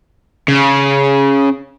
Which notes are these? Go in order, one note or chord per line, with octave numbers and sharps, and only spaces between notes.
C#3